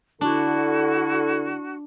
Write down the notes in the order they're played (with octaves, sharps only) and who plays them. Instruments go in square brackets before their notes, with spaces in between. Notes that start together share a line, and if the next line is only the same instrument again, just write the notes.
[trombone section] D3 A4 [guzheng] D4 [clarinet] E4 [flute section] F#4